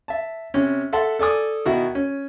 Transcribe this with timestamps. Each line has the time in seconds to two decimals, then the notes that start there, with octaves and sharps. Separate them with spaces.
0.08 E5 A5
0.54 C3 C#4
0.93 A4 E5 F#5 A5 C6
1.19 A4 D5 G#5 D#6
1.65 B2 D#3 E4 F#4
1.95 C#4